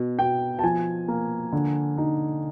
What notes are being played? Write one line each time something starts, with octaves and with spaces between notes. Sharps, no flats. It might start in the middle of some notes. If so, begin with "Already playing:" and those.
Already playing: B2
B2 G5
A5
F3 G#5
A#3
D3
D#4